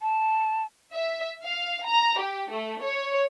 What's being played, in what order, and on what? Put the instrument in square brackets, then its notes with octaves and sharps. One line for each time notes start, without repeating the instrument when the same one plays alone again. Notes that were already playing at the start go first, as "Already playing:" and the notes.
[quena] A5
[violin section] E5
F5
A#5
G4
A3
C#5